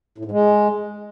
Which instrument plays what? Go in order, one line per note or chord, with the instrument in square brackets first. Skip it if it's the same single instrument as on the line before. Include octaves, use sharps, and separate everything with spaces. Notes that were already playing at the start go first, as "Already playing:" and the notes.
[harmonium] A2
G#2
G#3